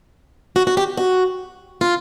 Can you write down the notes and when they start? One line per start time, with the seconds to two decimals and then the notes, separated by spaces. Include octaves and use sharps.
0.56 F#4
0.67 F#4
0.77 G4
0.97 F#4
1.81 F4